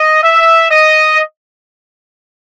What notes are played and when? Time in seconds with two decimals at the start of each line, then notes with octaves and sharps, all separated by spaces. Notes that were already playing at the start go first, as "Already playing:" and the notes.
Already playing: D#5
0.23 E5
0.70 D#5